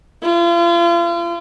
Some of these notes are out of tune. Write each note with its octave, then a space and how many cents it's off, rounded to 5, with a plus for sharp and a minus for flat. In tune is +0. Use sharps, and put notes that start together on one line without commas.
F4 -40